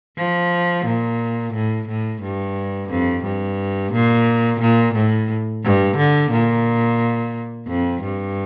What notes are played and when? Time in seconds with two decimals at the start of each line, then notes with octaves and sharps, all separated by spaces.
0.18 F3
0.86 A#2
1.54 A2
1.88 A2
2.22 G2
2.90 F2
3.24 G2
3.93 A#2
4.60 A#2
4.95 A2
5.64 G2
5.97 D3
6.31 A#2
7.67 F2
8.02 G2